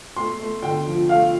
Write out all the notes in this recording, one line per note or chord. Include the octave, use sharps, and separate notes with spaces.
A3 C6
A3
D3 G5
F3
A3 F5